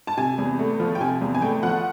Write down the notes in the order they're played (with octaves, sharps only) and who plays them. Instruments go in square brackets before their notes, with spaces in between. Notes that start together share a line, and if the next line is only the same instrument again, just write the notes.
[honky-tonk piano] A5
C3 G#5
E2
A3
F3
G5
C3 G#5
E2
G#5
A3 G5
F3 F#5